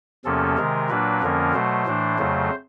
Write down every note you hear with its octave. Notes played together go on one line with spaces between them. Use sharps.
E2 C3 F3 A#3 C#4 A4
C3 D#3 G#3 A#4
A#2 F#3 A#3 D4 B4
F2 D3 F3 A#3 C#4 A#4
B2 F#3 A3 C5
A2 E3 A3 D4
F2 C#3 F#3 A3